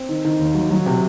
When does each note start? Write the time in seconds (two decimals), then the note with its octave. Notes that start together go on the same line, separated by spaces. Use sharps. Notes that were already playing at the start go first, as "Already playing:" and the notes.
Already playing: C4
0.09 D#3
0.25 D#3
0.39 D#2
0.55 F#3
0.70 F#3
0.86 C3